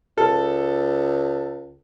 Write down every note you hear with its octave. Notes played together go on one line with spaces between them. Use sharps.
C#2 A4